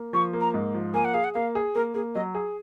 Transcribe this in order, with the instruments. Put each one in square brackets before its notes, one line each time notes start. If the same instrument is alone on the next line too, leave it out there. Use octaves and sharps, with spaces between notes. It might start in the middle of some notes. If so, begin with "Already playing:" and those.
Already playing: [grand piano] A#3
[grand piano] F3 [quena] C#6
[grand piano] A#3
[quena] A#5
[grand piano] G#2
F3
[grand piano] A#3 [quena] G#5
[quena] F#5
[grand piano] G#4 [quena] F5
[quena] F#5
[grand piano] A#3 [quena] F5
[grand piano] G#4
[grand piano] A#3 [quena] A#4
[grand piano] A#3 [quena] G#4
[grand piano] F#3 [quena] D#5
[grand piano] G#4